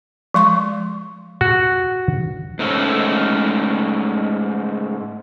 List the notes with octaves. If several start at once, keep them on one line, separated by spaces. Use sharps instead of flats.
F3 G#3 C6 C#6
F#4
G#2 A3 C#4